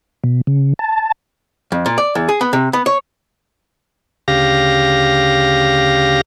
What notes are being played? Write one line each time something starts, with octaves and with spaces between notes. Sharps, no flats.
B2
C#3
A5
F2
A#2
D5
E2
G#4
B3
C3
B3
C#5
D2 C#3 G4 F5 A#6